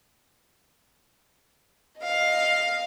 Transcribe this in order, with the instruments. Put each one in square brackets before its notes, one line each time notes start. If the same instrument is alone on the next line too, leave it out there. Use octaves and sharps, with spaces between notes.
[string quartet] D#5 F5